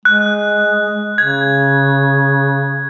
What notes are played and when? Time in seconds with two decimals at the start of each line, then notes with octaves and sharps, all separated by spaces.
0.05 G#3 F#6
1.18 C#3 G#6